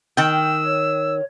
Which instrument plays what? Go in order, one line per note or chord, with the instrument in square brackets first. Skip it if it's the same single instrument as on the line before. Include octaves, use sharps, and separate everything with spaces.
[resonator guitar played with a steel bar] D#3 G5 [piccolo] E6
[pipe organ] C#5